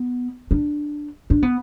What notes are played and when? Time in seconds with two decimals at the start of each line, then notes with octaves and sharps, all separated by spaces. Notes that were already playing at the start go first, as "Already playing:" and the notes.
Already playing: B3
0.51 D4
1.30 D4
1.42 B3